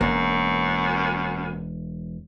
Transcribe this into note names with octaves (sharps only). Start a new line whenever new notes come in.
E1 F#2 A#3